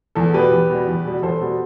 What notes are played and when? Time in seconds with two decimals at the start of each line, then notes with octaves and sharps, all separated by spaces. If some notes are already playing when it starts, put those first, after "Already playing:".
0.15 E2 A4
0.34 B2 G3 G4 B4
0.52 E2
0.70 B2 G3
0.87 E2
1.05 B2 G3
1.22 E2 A4 C5
1.41 B2 G3